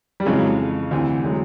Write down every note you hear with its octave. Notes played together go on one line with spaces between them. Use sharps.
G3
F2 C#3 E3 F#3 G#3
D2 C3 E3
F#3 G#3